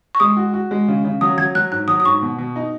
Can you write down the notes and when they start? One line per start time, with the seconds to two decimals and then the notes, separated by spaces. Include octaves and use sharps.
0.15 C#6
0.20 G#3 D#6
0.37 F#4
0.53 F#4
0.71 G#3
0.88 C#3
1.04 C#3
1.21 F#3 D#6
1.38 F#3 G#6
1.55 F#3 F#6
1.71 G#2 F#6
1.88 F#3 D#6
2.00 D#6
2.05 G#2 C#6
2.22 B2
2.38 B2
2.56 D#4